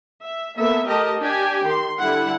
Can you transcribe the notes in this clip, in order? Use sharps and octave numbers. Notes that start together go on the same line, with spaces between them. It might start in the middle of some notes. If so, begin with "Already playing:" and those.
E5
A#3 B3 A4 E5
A3 G4 A#4 D#5 A5
D4 G4 G5 G#5
D#3 C6
D3 G3 E4 F#5